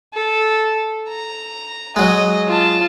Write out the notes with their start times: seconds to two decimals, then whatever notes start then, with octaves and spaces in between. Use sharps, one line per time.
0.14 A4
1.08 A#5
1.96 F#3 G#3 D#5
2.48 F4 A5